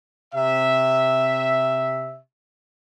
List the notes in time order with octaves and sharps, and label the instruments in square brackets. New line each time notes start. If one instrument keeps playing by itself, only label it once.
[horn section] C3 E5